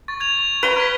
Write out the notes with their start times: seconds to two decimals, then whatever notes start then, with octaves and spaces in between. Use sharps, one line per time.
0.08 C#6 A6
0.20 G#6 F7
0.63 B4 A#5 D7 G7
0.76 F6 G#6 B6